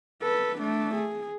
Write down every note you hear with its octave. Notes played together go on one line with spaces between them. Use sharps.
A4 B4
A3 D4
G#4